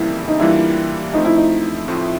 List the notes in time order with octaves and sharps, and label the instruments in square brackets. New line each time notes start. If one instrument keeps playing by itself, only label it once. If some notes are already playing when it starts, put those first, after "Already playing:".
Already playing: [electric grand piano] F2 C#3 E3 G3 A#3 [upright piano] E4
[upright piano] D#4
[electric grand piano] E3 G3 A#3 D4 F4 [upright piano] E4
[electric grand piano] F3 A3 C4 [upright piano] D#4
[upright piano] E4
D#4
[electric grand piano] A2 F3 A3 C4 F4